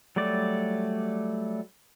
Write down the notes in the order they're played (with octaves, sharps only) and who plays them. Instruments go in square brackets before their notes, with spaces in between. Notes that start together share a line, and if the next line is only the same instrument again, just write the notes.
[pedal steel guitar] F#3 G3 A3 D5